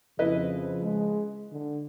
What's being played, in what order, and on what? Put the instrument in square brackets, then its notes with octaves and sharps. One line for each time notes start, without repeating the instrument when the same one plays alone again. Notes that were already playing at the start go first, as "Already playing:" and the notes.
[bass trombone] F2 [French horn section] C#3 F3 [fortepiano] E4 B4 D#5
[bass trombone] G#3
D3